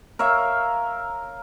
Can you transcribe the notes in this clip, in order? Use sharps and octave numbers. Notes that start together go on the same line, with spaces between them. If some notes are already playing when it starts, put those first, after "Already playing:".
A#4 C#5 E5 F5